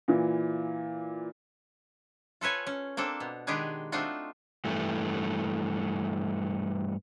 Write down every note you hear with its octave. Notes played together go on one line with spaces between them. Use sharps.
A#2 E3
F4 A4 B4 C#5 G#5
C#4
A#3 C4 D4 A4
B2
D#3 G#3 D4 G4 G#4 B4
A3 C4 D4 D#4 F4 F#4
G2 E3 A3